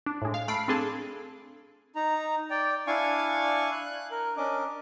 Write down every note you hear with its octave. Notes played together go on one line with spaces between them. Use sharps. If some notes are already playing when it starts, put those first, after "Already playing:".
D4
A2 G#3
F5
A3 B5 F6 C7 D7
C4 D4 G#4 A4 A5
D#4 A#5
D5 G5
D4 E4 F5 G#5 C#6
F#6
A#4
C#4 D4 A#4 D#5 D6